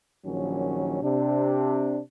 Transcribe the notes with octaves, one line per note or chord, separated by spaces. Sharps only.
A#1 D#3 F#3 C#4
C3 D4